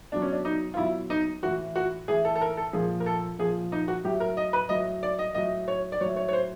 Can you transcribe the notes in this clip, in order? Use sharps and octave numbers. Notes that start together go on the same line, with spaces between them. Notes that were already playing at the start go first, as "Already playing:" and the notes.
B2 F#3 D4
C#4
D4
D#4
F4
B2 F#3 E4
D#4
A2 E3 F#4
F#4
A2 E3 G#4
A4
A4
A#4
A4
A#2 F3 G#4
A#4
A4
A#2 F3 G#4
D#4
F#4
A2 F#3 G4
A#4
D#5
B4
A2 F#3 D#5
D5
D#5
A2 F#3 D#5
C#5
D5
A2 F#3 C#5
C#5
C#5
C5